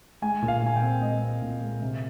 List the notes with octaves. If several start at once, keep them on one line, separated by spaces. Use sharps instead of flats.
G#3 G#5
A#2
F5
A#2 G#5
G5
C4
G#3 D#5
C4
A#2
G#3
C3